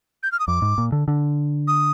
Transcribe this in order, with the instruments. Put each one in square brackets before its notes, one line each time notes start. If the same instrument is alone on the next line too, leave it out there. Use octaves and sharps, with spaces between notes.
[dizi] G6
F6
D#6
[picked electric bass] F2 [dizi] D6
[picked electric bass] G#2
A#2
D3
D3
[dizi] D#6